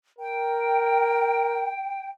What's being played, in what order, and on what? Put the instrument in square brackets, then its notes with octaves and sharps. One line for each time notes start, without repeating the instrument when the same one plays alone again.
[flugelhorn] A#4 [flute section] G5